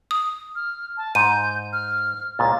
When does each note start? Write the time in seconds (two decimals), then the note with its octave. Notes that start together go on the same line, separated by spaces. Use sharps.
0.11 D#6
0.55 F6
0.97 A5
1.15 G#2 G6 D#7
1.73 F6
2.39 C#2 A#2 A6